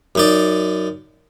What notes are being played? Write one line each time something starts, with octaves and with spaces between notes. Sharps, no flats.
F#2 D#4 D5